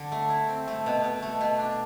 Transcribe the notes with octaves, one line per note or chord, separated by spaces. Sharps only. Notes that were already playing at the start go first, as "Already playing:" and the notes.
Already playing: D3
A3
E4
C4
A3
B2
B2
A3
B2
D4